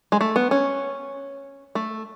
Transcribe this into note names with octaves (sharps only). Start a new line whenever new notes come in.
G#3
A3
B3
C#4
A3